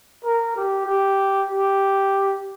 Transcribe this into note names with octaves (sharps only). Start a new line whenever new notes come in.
A#4
G4
G4
G4